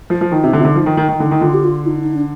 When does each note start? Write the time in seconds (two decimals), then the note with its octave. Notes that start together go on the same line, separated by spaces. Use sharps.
0.10 F3
0.21 F3
0.32 D#3 D#4
0.43 C3
0.53 D3 D#4
0.60 C3
0.65 D3
0.76 F3
0.86 D#3
0.97 D#3
1.08 D#3
1.20 D3
1.31 D#3 D#4
1.41 D3 F4
1.54 G4
1.64 F4
1.86 D#4
2.01 D#4
2.14 D4